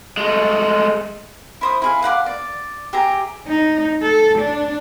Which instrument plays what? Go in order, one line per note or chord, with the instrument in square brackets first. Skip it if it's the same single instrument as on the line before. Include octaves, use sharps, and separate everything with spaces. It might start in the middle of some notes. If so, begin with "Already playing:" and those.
[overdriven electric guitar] G#3 A3
[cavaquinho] E4 C5 D#6
E4 G#4 F5
F5 F#5 B5 D6
D5
G4 G#4 E5 A#5
[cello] D#4
A4
D4